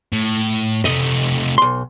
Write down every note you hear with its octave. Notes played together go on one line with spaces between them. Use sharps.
A2
C3 A3 D#5
B1 C6